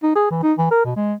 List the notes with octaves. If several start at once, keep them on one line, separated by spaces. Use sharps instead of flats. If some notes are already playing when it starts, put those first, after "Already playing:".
D#4
G#4
E3
D#4
E3
A#4
B2
G#3